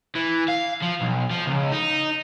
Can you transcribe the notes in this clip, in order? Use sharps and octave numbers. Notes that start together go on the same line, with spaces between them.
E3
F5
F3
B1
F3
C#2
D#4